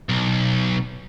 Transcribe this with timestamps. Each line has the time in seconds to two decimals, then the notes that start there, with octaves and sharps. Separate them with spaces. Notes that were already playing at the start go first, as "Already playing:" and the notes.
0.09 B1